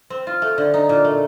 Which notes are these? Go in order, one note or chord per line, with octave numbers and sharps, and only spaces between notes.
C4
F4
A3
D3
D#4
A#2
A3